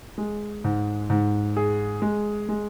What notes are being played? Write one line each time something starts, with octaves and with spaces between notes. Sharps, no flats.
G#3
G#2
G#2
G#4
G#3
G#3